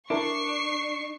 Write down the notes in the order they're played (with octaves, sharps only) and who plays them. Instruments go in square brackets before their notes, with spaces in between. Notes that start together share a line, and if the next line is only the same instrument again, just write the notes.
[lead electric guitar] D4 [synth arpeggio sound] E4 A#4 A5 [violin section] C#6 C7